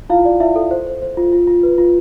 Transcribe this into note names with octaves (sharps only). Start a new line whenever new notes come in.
E4 F4 F5
D5
E4 E5
A4
C5
C5
C5
F4
F4
F4
B4
F4